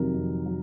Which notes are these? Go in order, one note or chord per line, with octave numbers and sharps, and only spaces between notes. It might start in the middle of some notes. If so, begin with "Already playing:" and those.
Already playing: F2 C3 D#3 F#3 A#4
F2
F#3